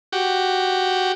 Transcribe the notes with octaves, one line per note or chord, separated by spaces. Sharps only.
F#4 G4